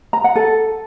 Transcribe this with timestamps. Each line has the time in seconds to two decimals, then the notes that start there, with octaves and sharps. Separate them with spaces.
0.13 A#5
0.24 F#5
0.36 A4